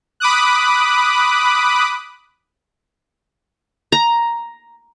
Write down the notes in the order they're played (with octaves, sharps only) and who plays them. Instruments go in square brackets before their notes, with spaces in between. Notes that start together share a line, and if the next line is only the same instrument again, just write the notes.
[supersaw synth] B5 D6 D#6 F#6
[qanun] A#5